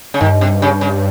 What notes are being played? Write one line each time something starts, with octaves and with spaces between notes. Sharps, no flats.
C#3
G2 D#3
C3
C#3
C#3